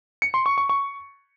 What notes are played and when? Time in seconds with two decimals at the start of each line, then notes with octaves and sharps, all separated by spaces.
0.22 C#7
0.34 C6
0.46 C#6
0.58 C#6
0.69 C#6